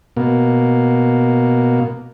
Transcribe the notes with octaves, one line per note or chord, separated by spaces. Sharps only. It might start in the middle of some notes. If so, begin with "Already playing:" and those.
B2 A#3